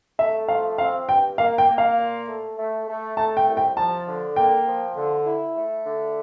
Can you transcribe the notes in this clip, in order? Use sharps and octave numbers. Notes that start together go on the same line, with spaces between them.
A3 E5
F3 F5
C4 F5
G2 G5
A#3 F5
G5
A#3
F5
A#2
A3
A3
A3
A3 A5
G5
C2
G5
F3 A5
D3
A#3 G5
F3
D3
E4
A3
D3